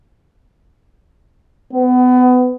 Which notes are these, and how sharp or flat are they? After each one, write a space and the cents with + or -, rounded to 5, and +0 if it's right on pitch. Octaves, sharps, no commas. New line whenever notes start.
B3 +25